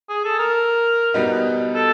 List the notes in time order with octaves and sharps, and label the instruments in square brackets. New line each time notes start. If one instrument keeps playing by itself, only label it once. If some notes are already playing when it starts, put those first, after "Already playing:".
[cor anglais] G#4
A4
A#4
[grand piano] B2 G3 B3 D#4
[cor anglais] A4